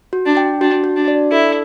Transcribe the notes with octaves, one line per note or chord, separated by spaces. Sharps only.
F#4
D4
G5
D4 F#4
F#4
D4
D5
E4 A4